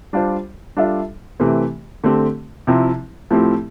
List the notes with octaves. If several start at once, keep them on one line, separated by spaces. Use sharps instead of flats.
G3 D4 F4 C5
G3 D4 F4 A4 E5
C3 E3 A3 C4 G4
D3 A3 C4 G4
C3 F3 C4 E4
A2 F3 C4 E4 G4